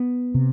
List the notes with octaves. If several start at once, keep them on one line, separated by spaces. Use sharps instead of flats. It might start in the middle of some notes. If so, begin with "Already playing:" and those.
Already playing: B3
C3